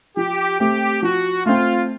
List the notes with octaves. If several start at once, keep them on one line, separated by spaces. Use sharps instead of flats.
F3 G4
A3 C4 G4
F3 F#4
A3 C4 F4